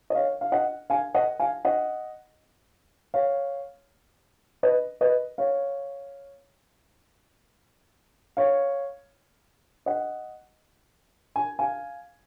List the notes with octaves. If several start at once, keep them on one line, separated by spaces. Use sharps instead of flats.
D#5
C#5 F5
F5
D#5 F#5
F5 G#5
D#5 F#5
F5 G#5
D#5 F#5
C#5 F5
B4 D#5
B4 D#5
C#5 F5
C#5 F5
D#5 F#5
G#5
F5 G#5